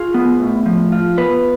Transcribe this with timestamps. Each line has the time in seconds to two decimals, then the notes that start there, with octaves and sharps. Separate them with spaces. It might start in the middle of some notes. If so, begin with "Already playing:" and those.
Already playing: F4 G#4
0.14 B3
0.40 A2
0.66 F3
0.92 F4
1.18 B3 B4